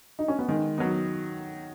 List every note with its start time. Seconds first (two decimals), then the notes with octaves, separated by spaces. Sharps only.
0.19 D#4
0.28 C#4
0.39 B3
0.48 D#3 G#3
0.78 F#3 B3 D#4